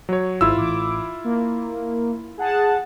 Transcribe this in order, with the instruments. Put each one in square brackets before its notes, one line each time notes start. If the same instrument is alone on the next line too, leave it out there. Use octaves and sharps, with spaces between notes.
[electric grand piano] F#3 C#5
[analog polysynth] G#1 [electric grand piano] E4 F4 E6
[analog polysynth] A1 D6
A#3
G#4 F#5 A5